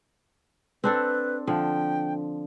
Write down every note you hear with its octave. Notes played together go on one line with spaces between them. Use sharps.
C4 D4 A4 B4
D3 F3 G5